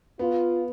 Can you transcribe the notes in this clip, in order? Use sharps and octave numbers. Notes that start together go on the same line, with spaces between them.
B3 F4